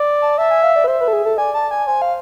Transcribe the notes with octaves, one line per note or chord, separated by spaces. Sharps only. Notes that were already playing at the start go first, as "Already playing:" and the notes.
Already playing: D5
A5
E5 A5
G#5
F5
D5
B4
C5 E5
B4
A4
G#4
A4
D5 G#5
A5
G#5
C5 G#5
F5